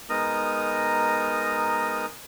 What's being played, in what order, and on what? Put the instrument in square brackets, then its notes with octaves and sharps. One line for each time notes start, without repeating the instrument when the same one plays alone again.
[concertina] G#3 B3 D#4 A#4 A#5 D#6